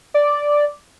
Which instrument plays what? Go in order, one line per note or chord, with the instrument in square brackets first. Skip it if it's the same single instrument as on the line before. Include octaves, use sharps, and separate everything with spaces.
[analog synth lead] D5